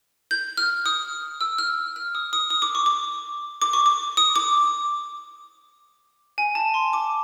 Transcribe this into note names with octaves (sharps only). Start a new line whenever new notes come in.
G6
F6
D#6
E6
F6
F6
D#6
D#6
D#6
D6
C#6
D6
D6
C#6
D6
D#6
D6
G#5
A5
C6
D6